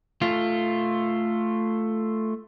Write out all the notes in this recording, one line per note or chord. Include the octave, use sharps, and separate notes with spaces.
A3 F4